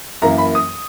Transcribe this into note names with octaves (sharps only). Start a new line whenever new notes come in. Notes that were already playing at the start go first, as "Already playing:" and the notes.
F#2 E3 A#3 A#5
B5
D#6